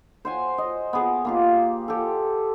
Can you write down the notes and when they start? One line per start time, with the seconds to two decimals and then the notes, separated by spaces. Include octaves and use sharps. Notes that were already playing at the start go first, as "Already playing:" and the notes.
0.25 C5 F#5 G#5
0.58 D#5
0.93 B3 G#4
1.25 A#3 F4 G4
1.88 G4 A4